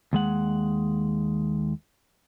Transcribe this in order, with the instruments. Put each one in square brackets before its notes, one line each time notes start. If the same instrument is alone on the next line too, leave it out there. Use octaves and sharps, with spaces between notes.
[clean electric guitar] D#2 G#3 F#5